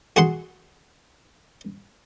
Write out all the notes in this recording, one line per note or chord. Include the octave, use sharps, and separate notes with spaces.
F#4 G#4 F#5 C6